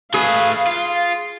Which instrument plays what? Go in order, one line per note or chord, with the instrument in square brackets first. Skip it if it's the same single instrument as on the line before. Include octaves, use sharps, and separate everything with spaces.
[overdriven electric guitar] A3 B4 [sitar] G#4 [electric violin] F5
[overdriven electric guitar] F4